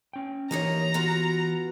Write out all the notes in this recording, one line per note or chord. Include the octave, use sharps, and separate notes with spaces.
C#4 G5
E3 A#3 D#4 G4 C#5 A#5
B3 F4 F#4